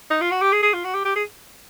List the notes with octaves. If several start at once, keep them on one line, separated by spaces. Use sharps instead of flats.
D#4
F4
F#4
G4
G#4
G#4
F4
F#4
G4
G4
G#4